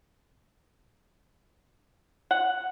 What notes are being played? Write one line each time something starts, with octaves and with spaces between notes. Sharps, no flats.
F#5